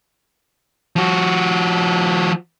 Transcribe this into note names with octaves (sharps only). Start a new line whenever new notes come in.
F3 F#4